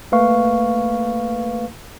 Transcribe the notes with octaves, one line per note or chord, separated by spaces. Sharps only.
A3 A#3 B4 F5 C#6